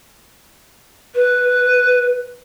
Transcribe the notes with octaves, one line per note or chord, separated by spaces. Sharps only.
B4